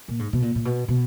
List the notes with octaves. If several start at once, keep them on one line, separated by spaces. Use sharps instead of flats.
A#2
G#2
B2
A#2
A#2
B2
B2